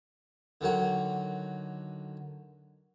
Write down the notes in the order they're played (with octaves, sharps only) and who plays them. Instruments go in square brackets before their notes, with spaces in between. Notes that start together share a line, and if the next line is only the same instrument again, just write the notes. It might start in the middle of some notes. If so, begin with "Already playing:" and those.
[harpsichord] D3 D#3 F#3 F#4